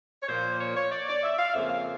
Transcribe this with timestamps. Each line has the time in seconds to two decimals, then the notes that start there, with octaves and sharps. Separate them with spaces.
0.23 C#5
0.28 A#2 F3 A#3 C5
0.61 C#5
0.76 C#5
0.91 D5
1.08 D5
1.23 E5
1.38 F5
1.54 F2 C#3 F3 A#3 E5
1.70 F5